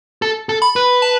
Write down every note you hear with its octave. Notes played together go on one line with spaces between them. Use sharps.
A4
A4
B5
B4
A5